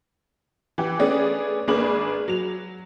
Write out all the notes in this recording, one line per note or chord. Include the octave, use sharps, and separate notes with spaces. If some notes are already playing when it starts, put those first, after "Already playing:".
E3 G4
A3 B3 C#4 D4 G#4 D5
G#1 A#3 D4 G#4 B4 F#7
F#3 F7